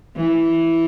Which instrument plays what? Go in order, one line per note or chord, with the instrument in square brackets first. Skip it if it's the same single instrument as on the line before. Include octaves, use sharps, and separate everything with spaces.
[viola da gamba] E3